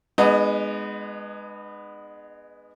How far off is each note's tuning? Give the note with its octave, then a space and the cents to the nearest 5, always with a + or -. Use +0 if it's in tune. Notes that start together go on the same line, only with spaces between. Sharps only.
G#3 +0 B3 +5 D#4 -40